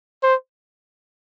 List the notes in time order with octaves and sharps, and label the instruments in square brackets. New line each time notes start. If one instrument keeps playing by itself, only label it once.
[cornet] C5